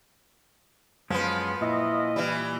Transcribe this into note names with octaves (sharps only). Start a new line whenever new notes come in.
F#2 F3 G#3 B3 C#4
A#2 E4 D#5
E3 G3